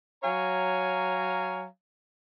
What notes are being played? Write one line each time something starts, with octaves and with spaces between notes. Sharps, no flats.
F#3 C#5 F5 G#5 A#5